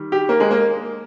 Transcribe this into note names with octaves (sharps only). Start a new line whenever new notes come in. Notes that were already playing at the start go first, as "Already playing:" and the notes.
Already playing: D#3 G3
G4
A#3
G#3
A#3